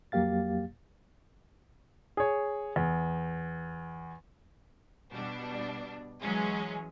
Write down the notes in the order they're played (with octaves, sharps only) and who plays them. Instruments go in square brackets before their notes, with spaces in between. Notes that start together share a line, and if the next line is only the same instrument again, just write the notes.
[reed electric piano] F2 F#3 A#3 G4 F5 A6
[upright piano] G#4 C#5
E2
[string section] B2 G3 D4
E3 F#3 G#3 C#4 G#4